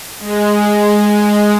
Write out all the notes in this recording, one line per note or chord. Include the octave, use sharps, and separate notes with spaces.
G#3